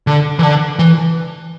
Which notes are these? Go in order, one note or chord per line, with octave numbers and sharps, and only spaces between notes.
D3
E3
D3
E3